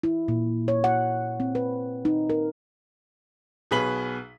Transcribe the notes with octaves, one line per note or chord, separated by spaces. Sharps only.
E4
A#2
C#5
F#5
C4
B4
D#4
A#4
B1 B2 G#4 B4 B6 F#7